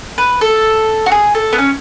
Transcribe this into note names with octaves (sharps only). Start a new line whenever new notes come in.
B4
A4
F#4
G#4
A4
B3
C#4